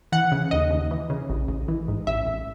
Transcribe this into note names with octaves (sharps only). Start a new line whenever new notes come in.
E3 F#5
C#3
D#2 D#5
D#2
E3
C#3
A1
A1
E3
G#2
A1 E5
A1